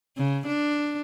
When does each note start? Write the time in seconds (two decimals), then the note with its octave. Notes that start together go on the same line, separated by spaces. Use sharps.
0.17 C#3
0.46 D4